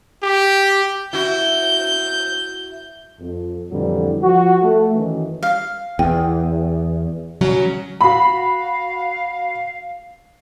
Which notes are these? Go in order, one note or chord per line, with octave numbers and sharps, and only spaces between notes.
G4
E4 F#4 G6
F2
F2 A2 D3 E3 F#3 G3
F3 F#4
A3
F#2 D#3 E3
F5
E2 G5
C#3 F#3 C#4
F#4 F5 B5